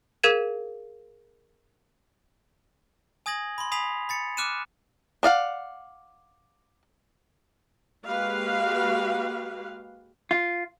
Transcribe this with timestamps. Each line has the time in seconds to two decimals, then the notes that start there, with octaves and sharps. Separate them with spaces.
0.23 G#4 A#4 F5 G#6 D#7 E7
3.26 G#5 D#6 G#6 A#6 F#7
3.58 B5 C6
3.72 G#5 B5 D#6 B6 C7 F7
4.09 B5 A6 C#7
4.37 D6 F6 F#6 C#7 D#7 E7
5.23 D4 D5 F5 F#5
8.06 G#3 A#3 F#4 G4 B4 F5
10.31 F4